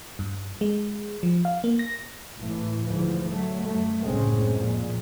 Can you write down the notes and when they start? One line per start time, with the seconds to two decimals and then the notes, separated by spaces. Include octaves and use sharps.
0.19 G2
0.61 G#3
1.23 F3
1.45 F5
1.64 A#3
1.79 A#6
2.37 G#1 A2 E3 A3
2.83 D2 G#2 E3 F3
3.29 F#3 A3
3.67 F#2 A3
4.04 F#1 C2 A2 G#3 C4 C#4
4.54 F2 A#2 G#3